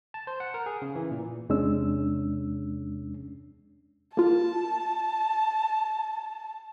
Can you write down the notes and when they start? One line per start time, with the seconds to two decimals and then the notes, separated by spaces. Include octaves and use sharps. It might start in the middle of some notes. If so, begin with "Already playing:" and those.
0.14 A5
0.27 C5
0.40 F#5
0.54 A#4
0.66 G#4
0.82 C#3
0.95 E3
1.11 A#2
1.49 E2 C3 G#3 C#4 D4 E6
4.17 A#3 F4 A5